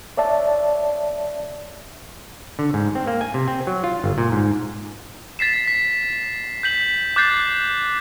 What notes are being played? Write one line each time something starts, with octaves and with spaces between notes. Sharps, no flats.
C#5 D5 E5 A5
D3
G#2
C4
A#3
G#5
C3
C4
F#3
F4
G1
A#2
G#2
A6 B6 C7 E7
B6
G6 B6 F#7
D6 F#6 G6 A6 C7